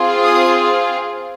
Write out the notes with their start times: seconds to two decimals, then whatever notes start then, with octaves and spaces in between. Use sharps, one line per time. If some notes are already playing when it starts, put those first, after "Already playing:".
Already playing: C4 F4 G#4
0.25 D#6